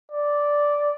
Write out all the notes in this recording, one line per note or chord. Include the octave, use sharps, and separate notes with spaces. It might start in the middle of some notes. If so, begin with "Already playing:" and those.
D5